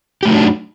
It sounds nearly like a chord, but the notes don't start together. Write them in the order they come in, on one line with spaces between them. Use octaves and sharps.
G4 A3 F#3 D#4 D4